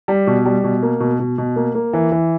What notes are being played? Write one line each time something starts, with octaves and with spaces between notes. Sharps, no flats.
G3
B2
G3
B2
A#3
B2
B2
B2
A#3
A#3
E3
E3